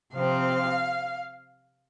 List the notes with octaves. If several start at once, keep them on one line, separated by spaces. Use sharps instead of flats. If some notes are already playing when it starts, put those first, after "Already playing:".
C3 F3 C4 F5